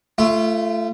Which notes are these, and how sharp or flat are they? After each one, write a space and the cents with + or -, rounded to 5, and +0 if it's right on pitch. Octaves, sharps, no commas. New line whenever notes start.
A3 +0 F4 -30